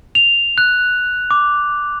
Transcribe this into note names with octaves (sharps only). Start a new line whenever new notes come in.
F7
F#6
D6